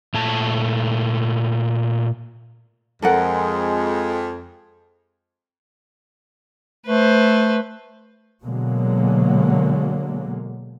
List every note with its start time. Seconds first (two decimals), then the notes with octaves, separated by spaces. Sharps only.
0.14 A#2 A3 A5
3.02 F2 G#3 A4 A#4 F#5
6.86 A3 B4 C5
8.45 B2 D3 F#3 G#3 A#3